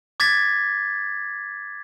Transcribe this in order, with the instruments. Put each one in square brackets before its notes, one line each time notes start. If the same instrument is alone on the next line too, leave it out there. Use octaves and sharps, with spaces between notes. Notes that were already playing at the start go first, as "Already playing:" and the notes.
[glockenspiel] D6 G#6 A6 B6